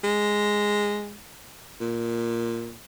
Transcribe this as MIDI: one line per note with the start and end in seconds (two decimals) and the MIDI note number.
0.04 1.16 56
1.81 2.76 46